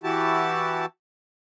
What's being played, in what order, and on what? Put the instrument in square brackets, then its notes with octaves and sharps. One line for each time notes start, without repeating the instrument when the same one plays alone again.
[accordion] E3 E4 F#4 G4 A5